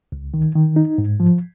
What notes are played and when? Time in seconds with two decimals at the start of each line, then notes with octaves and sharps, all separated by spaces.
0.12 C#2
0.34 D#3
0.55 D#3
0.76 D#4
0.98 G#2
1.20 F3